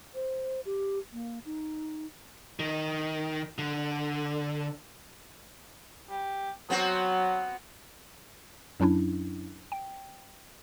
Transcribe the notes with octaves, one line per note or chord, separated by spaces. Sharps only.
C5
G4
A#3
D#4
D#3
D3
G4
F#3 B3 C4 F#4
F#2 F#3 C#4 D4 E4
G5